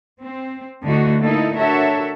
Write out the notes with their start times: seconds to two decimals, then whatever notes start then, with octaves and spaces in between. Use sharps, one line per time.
0.21 C4
0.84 D2 A2 D3 A3 D#4 F#4
1.22 A#3 D#4 E4 A4
1.56 D4 F#4 A4 A#4 C#5 E5